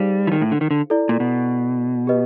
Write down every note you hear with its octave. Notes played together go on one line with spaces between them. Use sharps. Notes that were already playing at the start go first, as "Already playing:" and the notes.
Already playing: G3 D#4 G#4 C5 F5
E3
D#3
A2
D3
D#3
D3
E4 A4 D5
A#2
B2
G4 B4 D#5